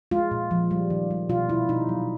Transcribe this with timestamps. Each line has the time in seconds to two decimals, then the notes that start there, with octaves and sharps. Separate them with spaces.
0.11 G#3 F4
0.31 A#2
0.51 F3
0.71 G3
0.90 D#3
1.11 G3
1.29 B2 F4
1.49 B2 E4
1.69 B2 D#4
1.89 F#3